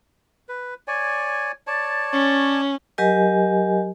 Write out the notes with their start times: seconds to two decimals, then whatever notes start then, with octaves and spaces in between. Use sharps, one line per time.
0.49 B4
0.88 C#5 D5 G#5
1.67 C#5 D5 A5
2.13 C#4
2.98 F#3 G4 A#4 D#5 G#5